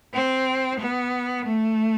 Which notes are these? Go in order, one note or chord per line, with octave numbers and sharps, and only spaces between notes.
C4
B3
A3